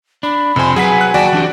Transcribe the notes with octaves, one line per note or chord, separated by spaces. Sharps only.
D4 B5
F2 C3 C5 G#5
F#3 G#4 B4 F#5 G#5 B6
F#5 F#6
D#2 F#4 D5 G5 A5
E3 D4 G4